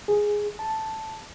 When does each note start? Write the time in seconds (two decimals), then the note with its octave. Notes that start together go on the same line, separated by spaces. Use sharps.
0.08 G#4
0.59 A5